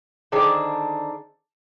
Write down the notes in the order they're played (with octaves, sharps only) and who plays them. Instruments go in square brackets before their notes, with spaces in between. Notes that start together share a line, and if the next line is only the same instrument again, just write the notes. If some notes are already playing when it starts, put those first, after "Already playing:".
[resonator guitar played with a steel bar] D3 D#3 D4 G#4 C5